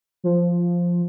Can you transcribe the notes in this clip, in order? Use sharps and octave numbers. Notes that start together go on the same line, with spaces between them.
F3